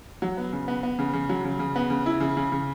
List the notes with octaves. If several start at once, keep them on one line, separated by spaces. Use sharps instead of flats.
F#3
B3
C#3
B3
B3
C#3
C#3
F#3
C#3
C#3
B3
C#3
E4
C#3
C#3
C#3